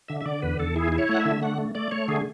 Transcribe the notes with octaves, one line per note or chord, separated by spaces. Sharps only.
D3 E5
E5
D3 D5
E2 B4
E2 A4
E4 G#4
E4
C#5
A3 F#5
E5
D3
A3 F#5
A3
A3 D5
A3 C#5
D3 G#4